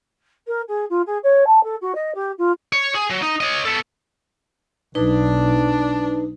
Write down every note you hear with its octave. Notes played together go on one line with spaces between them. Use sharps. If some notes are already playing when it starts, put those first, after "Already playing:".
A#4
G#4
F4
G#4
C#5
A5
A4
F#4
D#5
G4
F4
C#5
G#4
F#3
D#4
C#5 D#5
B3 A4
B1 D4 D#4 B4